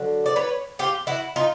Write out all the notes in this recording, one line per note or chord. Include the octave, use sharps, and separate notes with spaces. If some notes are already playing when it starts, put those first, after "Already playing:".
Already playing: D3 F#3
D5
B4 C#5
F4 G4
E4 F#4
D#4 F4